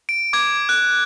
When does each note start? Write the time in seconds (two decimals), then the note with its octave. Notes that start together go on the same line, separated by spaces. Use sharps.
0.09 D7
0.33 D6 G#6
0.69 F#6